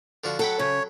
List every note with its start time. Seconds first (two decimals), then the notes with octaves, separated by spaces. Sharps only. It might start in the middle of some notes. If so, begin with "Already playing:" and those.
0.24 D3 F3 F#4
0.39 F#3 A4 F#5 G5 B5
0.59 C#3 C#5